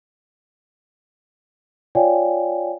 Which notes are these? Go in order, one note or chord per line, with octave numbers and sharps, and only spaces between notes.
F4 C#5 D5 F5 G5 G#5